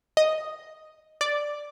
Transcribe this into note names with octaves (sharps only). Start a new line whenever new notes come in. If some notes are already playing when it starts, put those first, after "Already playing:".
D#5
D5